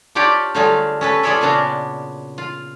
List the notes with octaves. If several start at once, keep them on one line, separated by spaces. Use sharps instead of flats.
D4 F4 G4 C#5 D5 G5
D3 F#3 G3 A3 F4 G#4
C#4 A4 B4
F4 G#4 A4 C#5 D5 E5
A#2 C#3 B3 D4 F#4
F4